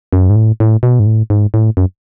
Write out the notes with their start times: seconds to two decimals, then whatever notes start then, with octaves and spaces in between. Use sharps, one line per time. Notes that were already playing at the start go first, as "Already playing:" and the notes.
0.13 F#2
0.30 G#2
0.36 A2
0.60 A2
0.83 B2
1.00 G#2
1.06 A2
1.30 G#2
1.54 A2
1.77 F#2